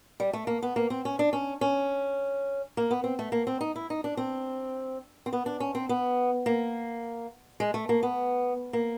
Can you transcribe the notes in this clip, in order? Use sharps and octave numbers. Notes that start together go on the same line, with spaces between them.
G3
A3
A#3
B3
A#3
C4
C#4
D4
C#4
C#4
A#3
B3
C4
A3
A#3
C4
D#4
E4
D#4
D4
C4
C4
B3
D4
C#4
C4
B3
A#3
G#3
A3
A#3
B3
A#3